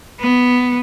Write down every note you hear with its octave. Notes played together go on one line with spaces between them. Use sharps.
B3